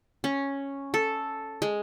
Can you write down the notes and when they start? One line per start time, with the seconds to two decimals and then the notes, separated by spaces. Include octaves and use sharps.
0.24 C#4
0.94 A4
1.62 G#3